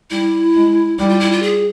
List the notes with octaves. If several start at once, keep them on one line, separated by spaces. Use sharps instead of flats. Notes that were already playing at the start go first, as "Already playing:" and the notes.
G3 E4
G#3
G3 E4
F4
E4
F4
G#4